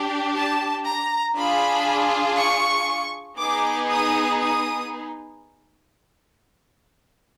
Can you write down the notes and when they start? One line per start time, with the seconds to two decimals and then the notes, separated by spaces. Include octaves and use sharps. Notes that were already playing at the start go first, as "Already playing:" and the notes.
Already playing: D4 G4
0.36 A5
0.86 A#5
1.36 D4 F4 G#4 B5
2.37 C#6
3.39 B3 D#4 G#4 D6
3.90 D#6
4.41 D#6